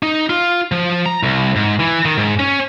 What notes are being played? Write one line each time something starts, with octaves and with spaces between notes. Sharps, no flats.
D#4
F4
F3
A#5
C2
G#2
E3
D#3
G#2
C#4